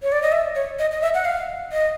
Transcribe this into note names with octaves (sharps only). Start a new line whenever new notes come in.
C#5
D5
D#5
E5
C#5
D#5
D#5
E5
F#5
F5
D#5